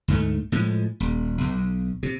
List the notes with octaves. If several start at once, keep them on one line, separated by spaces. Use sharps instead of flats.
D2 G#2 A3
A2 F3 G#3
D#1
B1
C3